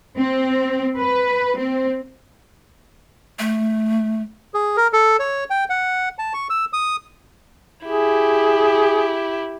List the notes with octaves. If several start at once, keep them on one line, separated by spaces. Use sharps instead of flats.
C4
B4
C4
A3
G#4
A#4
A4
C#5
G5
F#5
A5
C#6
E6
D#6
E4 G4 G#4